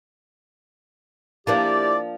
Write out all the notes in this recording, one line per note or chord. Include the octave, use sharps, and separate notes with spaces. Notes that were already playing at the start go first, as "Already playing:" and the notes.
F3 A#3 D4 E4 G4 D5